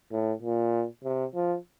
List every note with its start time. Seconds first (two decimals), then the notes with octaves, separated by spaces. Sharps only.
0.12 A2
0.42 A#2
1.04 C3
1.35 F3